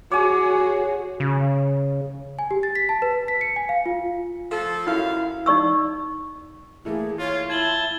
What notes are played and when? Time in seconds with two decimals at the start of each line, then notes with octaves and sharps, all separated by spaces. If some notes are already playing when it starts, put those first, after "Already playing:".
0.12 F#4 G#4 C#5 G#5 D6
1.20 C#3
2.39 G#5
2.51 G4
2.63 A6
2.75 B6
2.89 A5
3.02 B4
3.28 B6
3.41 C#7
3.56 G#5
3.69 F5
3.86 F4
4.52 F3 F4 A4
4.87 F#2 E4 F5
5.46 D#4 D5 C#6 E6
6.85 E3 A3 A#3 G#4
7.19 F4 C#5
7.50 E4 A5 G#6 F#7 G7